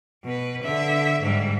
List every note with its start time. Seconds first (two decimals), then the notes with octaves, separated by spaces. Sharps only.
0.24 B2 B4
0.63 D3 E5
1.22 G#2 G3